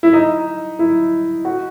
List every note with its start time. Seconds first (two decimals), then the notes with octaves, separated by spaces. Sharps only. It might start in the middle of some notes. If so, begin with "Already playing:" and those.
0.03 E4
0.13 D#4
0.79 E4
1.45 F#4